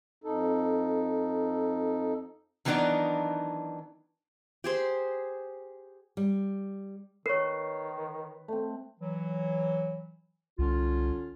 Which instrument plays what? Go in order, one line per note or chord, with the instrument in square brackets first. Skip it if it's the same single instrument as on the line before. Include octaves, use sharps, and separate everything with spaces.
[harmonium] F2 D#4 A4
[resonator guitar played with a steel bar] D#3 E3 F#3 B3 D4 D#4
[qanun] G4 G#4 C5
[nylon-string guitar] G3
[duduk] D#3 [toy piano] A#4 C#5 [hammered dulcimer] B4 [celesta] C#6 C7
[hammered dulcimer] A3 C4
[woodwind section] E3 F#3
[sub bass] C2 [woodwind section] D3 C#4 F4